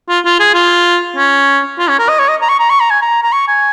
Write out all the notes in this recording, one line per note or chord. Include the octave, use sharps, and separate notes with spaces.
F4
F4
G#4
F4
C#4
F4
C#4
A#4
D#5
C#5
D#5
A#5
C#6
A#5
C#6
A#5
G#5
A#5
A#5
C#6
G#5